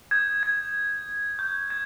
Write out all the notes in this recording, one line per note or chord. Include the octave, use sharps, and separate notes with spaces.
D#6 G6 G#6
G#6
C#6 F6 G6
G#6